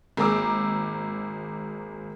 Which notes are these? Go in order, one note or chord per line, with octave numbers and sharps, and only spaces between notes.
G#1 A#3 G#4 A#5 D6 E6